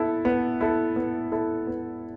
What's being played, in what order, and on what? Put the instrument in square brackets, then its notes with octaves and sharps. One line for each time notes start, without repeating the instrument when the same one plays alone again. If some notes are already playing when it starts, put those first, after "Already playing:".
Already playing: [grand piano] B3 E4 A4
B3
E4 A4
B3
E4 A4
B3